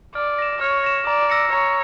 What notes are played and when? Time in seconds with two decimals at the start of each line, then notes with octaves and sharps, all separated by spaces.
0.15 D5 F6
0.39 A#6 E7
0.61 C#5 F6
0.84 A#6 E7
1.07 D5 A#5
1.30 E6 A#6 C#7
1.52 C#5 A#5